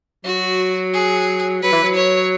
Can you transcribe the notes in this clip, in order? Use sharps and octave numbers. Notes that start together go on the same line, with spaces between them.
F#3 F#4
G#4
F#3 B4
E3
F#3
C#5